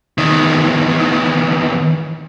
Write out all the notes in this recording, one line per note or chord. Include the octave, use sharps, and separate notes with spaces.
E2 D#3